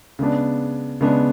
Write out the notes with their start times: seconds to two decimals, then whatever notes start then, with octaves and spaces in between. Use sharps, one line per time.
0.19 C#3 G#3 B3 D4
1.01 C#3 G#3 B3 D4